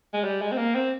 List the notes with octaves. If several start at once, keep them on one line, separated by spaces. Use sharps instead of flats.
G#3
G3
G#3
C4
A#3
C4